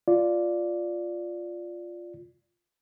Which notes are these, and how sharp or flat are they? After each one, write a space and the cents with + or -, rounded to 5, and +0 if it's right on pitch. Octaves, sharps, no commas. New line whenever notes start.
F4 +0 D5 +0